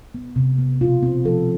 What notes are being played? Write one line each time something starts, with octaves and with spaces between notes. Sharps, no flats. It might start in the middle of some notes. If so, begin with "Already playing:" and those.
B3
C3
B3
B2 F4
C4
F3 A4